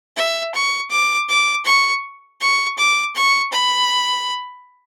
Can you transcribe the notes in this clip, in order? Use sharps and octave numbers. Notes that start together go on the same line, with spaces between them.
E5
C#6
D6
D6
C#6
C#6
D6
C#6
B5